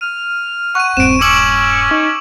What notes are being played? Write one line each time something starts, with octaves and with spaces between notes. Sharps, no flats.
F6 D#7
F#5 C#6 D#7
D#1 G2 C4 D7 E7
C#4 C#6 D6 E6 F#7
D#4